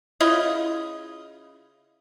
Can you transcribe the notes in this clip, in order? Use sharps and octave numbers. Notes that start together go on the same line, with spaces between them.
C#3 E4 F4 D#5